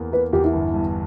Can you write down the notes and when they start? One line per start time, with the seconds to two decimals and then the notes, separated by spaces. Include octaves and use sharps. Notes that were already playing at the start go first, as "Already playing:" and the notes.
Already playing: E2 A#3
0.12 A#3 B4
0.33 E2 G4
0.44 E4
0.53 G1
0.74 G2